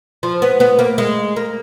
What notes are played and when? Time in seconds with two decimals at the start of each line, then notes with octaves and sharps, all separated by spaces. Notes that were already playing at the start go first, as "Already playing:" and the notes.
0.23 F3
0.42 B3
0.60 B3
0.79 A#3
0.98 G#3
1.36 A#3